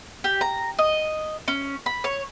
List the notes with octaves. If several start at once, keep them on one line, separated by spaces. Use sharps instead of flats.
G4
A#5
D#5
C#4
B5
C#5